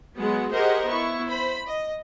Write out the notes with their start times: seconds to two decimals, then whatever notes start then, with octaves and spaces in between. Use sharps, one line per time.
0.17 F#3 G#3 B3 F#5
0.51 G4 G#4 A#4 C5 D#5 F#5
0.87 B3 E4 C#6
1.28 C5 B5
1.68 D#5